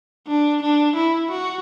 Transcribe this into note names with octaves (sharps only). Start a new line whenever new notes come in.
D4
D4
E4
F#4